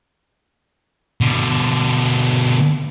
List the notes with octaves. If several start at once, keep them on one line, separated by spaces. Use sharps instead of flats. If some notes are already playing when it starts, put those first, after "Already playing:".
B2 D3